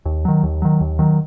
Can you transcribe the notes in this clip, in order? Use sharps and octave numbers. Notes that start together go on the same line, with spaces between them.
D#2
D#3 F#3
D#2
D#3 F#3
D#2
D#3 F#3